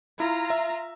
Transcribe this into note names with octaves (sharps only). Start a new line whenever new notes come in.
E4 F4 A#5
E5